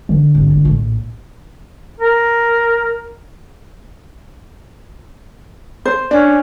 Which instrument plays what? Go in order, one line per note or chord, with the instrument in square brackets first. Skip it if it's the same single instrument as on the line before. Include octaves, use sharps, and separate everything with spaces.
[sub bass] D3 [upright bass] E3
[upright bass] G#1
A#3
A#1 A2
[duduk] A#4
[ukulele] C5
[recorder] C#4 [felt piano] D4